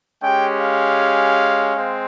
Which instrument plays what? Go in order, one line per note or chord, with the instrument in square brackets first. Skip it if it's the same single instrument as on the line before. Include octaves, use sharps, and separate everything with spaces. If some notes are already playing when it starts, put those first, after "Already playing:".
[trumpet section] G#3 C#4 G4 G5
F5
G#3 C4